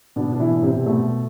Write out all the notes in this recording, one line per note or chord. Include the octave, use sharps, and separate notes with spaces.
B2 D3 D4
D4
E3 E4
B2
C3 C4
B2 A3